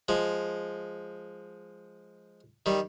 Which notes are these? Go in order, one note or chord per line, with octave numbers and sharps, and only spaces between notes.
F3 G#3
D#3 G3